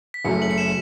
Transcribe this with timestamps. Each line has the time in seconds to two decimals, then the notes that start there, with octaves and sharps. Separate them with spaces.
0.14 B6
0.25 F#1 F#2 F#3 A3 C#7
0.42 F#7
0.51 C#7
0.58 E7